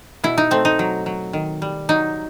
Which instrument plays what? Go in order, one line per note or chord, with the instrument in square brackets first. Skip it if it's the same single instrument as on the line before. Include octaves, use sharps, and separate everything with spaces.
[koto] B2 E4
D#4
A3 C4
D#4
F#3
F#3
D#3
G3
F#3 D#4